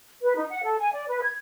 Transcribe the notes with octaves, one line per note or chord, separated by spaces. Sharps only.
B4
D#4
F#5
A4
G#5
D5
B4
G#6